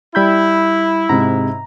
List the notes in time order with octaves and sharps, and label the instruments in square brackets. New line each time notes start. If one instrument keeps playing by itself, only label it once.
[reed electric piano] G3 B5 G6 [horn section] E4
[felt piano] G#2 C3 [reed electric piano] A#5